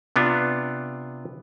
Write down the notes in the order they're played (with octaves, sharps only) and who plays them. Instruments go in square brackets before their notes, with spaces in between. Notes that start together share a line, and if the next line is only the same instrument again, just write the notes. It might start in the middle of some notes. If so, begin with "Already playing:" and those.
[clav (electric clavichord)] C3 B3 D4 F4